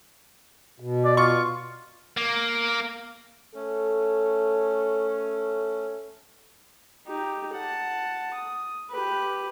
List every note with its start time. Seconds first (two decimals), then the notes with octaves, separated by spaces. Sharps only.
0.80 B2
1.05 D5
1.17 F4 C#6
2.17 A#3
3.55 A3 C#4 A4
7.07 D#4 G4
7.55 F#5 A5
8.34 D#6
8.90 G4 B4